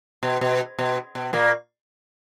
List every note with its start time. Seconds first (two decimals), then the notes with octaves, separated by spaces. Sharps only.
0.23 B2
0.41 B2
0.79 B2
1.15 B2
1.33 A#2 A#3